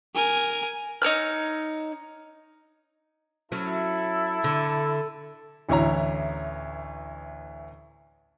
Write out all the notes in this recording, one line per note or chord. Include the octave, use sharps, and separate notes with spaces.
A#4 G#5
D#4 C#5 E6 F6
F#3 C#4 E4 A4
D3
A1 D2 E3 E4 C#5 A#5